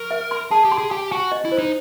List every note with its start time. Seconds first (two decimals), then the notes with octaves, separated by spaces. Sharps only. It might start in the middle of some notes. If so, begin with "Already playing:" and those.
Already playing: A#4 C#6
0.11 E5
0.31 C6
0.51 G#4 A5
0.65 G4
0.72 C6
0.78 G#4
0.91 G4 G#5
1.11 F#4 G#5
1.32 D#5
1.45 E4
1.52 C5
1.58 D#4